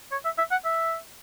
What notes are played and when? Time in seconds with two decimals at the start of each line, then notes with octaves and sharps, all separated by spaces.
0.12 C#5
0.25 E5
0.38 E5
0.51 F#5
0.65 E5